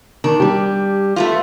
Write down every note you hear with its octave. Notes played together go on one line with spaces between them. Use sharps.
D#3 D4
G3 G4
A3 B3 F4